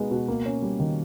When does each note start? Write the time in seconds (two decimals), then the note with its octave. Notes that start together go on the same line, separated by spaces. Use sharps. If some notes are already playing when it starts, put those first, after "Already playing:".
Already playing: B2 G#3 B3 D#4
0.11 B2
0.28 A#3
0.46 C#4
0.62 G3
0.80 D#3